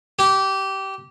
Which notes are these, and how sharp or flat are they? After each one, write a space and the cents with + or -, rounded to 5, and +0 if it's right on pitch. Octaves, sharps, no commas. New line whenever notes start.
G4 -20